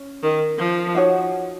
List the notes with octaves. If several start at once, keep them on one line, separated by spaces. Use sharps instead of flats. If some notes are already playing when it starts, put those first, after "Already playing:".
Already playing: C#4
D#3
F3
D#4 F#4 C#5 F#5